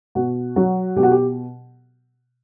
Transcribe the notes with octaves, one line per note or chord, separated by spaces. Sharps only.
B2 F#4
F#3 F#4
B2 G4
F#4
G4